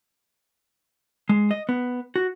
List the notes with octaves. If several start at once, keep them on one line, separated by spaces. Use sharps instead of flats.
G#3
D#5
B3
F#4